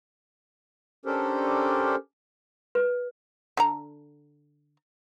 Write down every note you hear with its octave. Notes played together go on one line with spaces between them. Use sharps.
C#4 D4 G4 A4 A#4 C5
B4
D3 A4 A#5